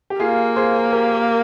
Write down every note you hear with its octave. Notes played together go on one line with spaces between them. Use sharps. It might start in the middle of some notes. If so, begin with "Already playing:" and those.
G4
A#3 F4 G#4
G#4 C5
G4 A#4